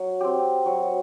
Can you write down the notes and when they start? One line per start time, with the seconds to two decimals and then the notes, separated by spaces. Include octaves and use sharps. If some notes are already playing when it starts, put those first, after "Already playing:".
Already playing: F#3
0.21 C4 G4
0.66 F#3